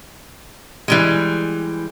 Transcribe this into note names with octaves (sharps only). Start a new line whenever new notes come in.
E3 G3 G#3